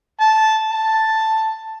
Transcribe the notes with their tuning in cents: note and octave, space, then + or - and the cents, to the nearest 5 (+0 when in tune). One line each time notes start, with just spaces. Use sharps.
A5 -10
A5 +5